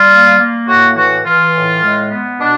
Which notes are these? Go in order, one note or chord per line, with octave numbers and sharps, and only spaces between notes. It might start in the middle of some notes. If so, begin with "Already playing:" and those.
Already playing: G3 F4
A#3
A#3
A2 F#4
E3 F#4
E3 F4
A2
G#3
B3
B2 D4